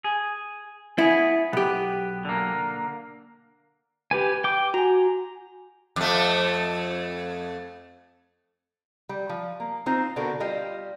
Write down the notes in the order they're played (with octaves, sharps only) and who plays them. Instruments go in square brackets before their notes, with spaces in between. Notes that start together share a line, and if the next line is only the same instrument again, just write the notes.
[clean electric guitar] G#4
[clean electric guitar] B3 G#4 [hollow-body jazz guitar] E4
[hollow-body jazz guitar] B1 G4 [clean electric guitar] B3
[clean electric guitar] D3 A#3
[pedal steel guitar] G4 B4 G#5
G5 D6
[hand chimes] F#4 G#5 [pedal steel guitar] A#5
[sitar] F2 A3
[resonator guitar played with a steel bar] G3
F3
A#3
C4 D#4 F4 C5
B2 D3 D4 F#4 A4 A#4
G3 F4 D#5